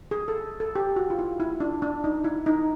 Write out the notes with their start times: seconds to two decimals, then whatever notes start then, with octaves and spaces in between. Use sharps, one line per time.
0.11 G#4
0.28 A4
0.60 A4
0.75 G4
0.96 F#4
1.10 F4
1.19 E4
1.40 E4
1.60 D4
1.82 D4
2.04 D#4
2.24 E4
2.46 D#4